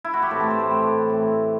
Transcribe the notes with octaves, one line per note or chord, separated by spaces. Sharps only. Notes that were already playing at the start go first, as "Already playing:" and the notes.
E4
F#4
G4
A2 E3 A3 C4 A4
A4
C5
B4
A2 E3 A3 C4 G4
A2 E3 A3 C4